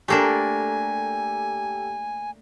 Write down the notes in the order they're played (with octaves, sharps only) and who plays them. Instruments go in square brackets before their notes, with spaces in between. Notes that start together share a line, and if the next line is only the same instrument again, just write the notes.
[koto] A3 A#3 D4 [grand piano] G4 A4 A#5 [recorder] G#5